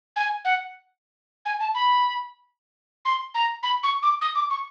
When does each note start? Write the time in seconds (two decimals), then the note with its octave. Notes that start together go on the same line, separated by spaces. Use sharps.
0.16 G#5
0.44 F#5
1.45 G#5
1.60 A5
1.74 B5
3.05 C6
3.34 A#5
3.63 B5
3.83 C#6
4.02 D6
4.21 D#6
4.35 D6
4.50 C#6